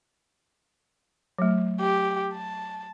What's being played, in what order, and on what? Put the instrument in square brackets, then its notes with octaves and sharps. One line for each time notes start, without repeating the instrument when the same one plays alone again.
[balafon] F#3 A3
[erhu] G4
A5